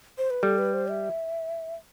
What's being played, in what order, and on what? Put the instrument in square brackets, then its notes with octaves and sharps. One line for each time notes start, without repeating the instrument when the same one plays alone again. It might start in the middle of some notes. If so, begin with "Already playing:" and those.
[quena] C5
B4
[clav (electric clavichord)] G3 [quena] A4
[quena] B4
C5
E5